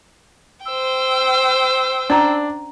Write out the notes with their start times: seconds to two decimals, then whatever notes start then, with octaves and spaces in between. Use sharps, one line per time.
0.65 C5 G5 E6
2.10 C#4 D4 D5 A#5